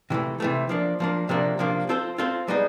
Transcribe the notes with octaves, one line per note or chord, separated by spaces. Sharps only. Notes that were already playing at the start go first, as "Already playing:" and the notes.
C3 E3 A3
C3 E3 A3
F3 A#3 D4
F3 A#3 D4
C3 F3 A#3 D4
C3 F3 A#3 D4
C4 F4 A4 C5
C4 F4 A4 C5
G3 B3 D#4 G#4